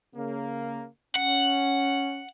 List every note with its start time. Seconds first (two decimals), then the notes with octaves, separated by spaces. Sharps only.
0.16 C#3 A#3
1.16 C#4 F#5